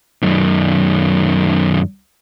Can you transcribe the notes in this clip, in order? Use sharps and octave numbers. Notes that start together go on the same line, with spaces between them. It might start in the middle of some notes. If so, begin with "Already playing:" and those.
F#2 D#3